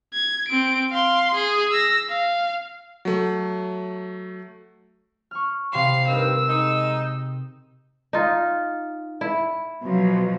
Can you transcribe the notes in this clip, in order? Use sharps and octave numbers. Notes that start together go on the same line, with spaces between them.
G#6
C4 D7
F5 C6
G#4
E6 A#6
F5
F#3 A3
C#6 F6
C3 F5 B5 C6 C7
G2 D#3 A#4 E6
G#3 D#4
D#4 F4
E4
B2 F3 F#3